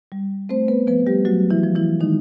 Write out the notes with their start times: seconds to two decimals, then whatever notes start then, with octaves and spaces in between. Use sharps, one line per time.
0.12 G3
0.49 A3 C4 C5
0.68 B3 B4
0.87 F3 B3 B4
1.07 G3 G4
1.25 F#3 A3 F#4
1.51 E3 E4
1.63 F3
1.76 E3 E4
2.00 D#3 G#3 D#4